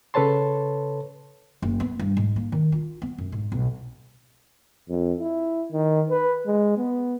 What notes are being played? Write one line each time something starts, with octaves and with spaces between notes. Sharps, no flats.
C#3 A4 B4 C#5 A5 C6
F#1
B3
G2
G#2
A#3
D#3
F4
B3
F#2
G#2
B1
F2
E4
D#3
B4
G#3
B3